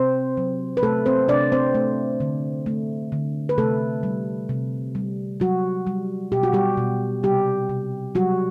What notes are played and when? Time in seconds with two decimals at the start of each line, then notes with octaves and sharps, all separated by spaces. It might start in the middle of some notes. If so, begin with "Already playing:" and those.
Already playing: C3 C4 C5
0.37 F#3
0.77 B4
0.83 C3 A3 A4
1.06 C4 C5
1.28 C3 D4 D5
1.52 C4 C5
1.75 A3
2.20 D3
2.66 A3
3.12 D3
3.49 B4
3.58 C3 A3 A4
4.03 G3
4.49 C3
4.95 G3
5.40 F#3 G3 F#4
5.87 G3
6.32 B2 G4
6.43 F#4
6.53 G3 G4
6.77 B2
7.23 C3 G3 G4
7.69 C3
8.15 F#3 G3 F#4